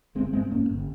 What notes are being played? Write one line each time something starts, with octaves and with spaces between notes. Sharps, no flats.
G1 G#3 C4
G2 G#3 C4
G2 A#3 C#4
G1